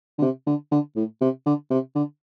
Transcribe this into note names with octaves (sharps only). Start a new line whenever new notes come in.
D3
C3
D3
D3
A2
C3
D3
C3
D3